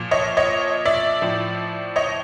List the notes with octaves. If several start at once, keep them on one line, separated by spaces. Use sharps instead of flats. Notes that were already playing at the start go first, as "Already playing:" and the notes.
Already playing: A#2 F3
C#5 D#5
C#5 D#5
D5 E5
A2 F3
C#5 D#5